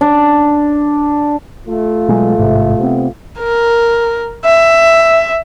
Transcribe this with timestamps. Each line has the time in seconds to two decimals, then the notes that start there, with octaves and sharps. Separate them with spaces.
0.01 D4
1.68 A3 F4
2.08 B2 F#3 G#3
2.38 A1 G#2 C3
2.79 C3 B3 C4
3.40 A#4
4.45 E5